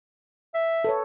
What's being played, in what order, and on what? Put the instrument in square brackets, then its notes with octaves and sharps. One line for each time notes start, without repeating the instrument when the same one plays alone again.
[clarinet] E5
[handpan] A4 B4 C#5